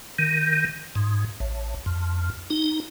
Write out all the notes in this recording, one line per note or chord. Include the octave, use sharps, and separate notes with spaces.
D#3
G#2
A1
F2
D#4